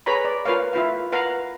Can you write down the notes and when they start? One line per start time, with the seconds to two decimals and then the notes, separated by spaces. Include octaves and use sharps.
0.06 G#4 B4 C#5 A#5 B5
0.25 D5
0.45 F4 A#4 B4 C#5 F5
0.73 E4 F4 B4 F5
1.12 B4 F5 F#5 A#5